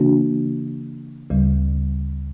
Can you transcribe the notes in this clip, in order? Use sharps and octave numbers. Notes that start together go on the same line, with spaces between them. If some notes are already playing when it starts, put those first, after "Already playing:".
Already playing: C#3 E3 A#3 D4 F#4
D2 C#3 G3